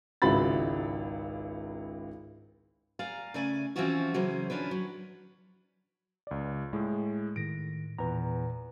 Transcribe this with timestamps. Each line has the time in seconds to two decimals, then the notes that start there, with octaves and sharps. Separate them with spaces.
0.22 G#1 C#2 E4 F#4 B5 A6
2.99 D5 F5 G#5 A#5
3.34 C#3 A3 D5 G#5
3.76 E3 F3 C4 C#4 F4 F#4
4.14 C#3 E3 F#3 C#4 C5
4.50 D#3 F3 C#4 D4 B4
4.71 F#3
6.27 C#2 D5
6.73 A2 G#3
7.36 A2 D#3 A#6 D7
7.99 E2 A#2 B4 A#5